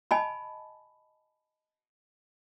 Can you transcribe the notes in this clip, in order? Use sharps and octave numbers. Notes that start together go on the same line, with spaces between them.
D#5 G#5 A5 B5